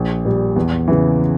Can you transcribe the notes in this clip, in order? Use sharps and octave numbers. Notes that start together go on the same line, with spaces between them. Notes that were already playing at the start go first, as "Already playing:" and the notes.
Already playing: A#1
A#2 G3
E2
C#3 E3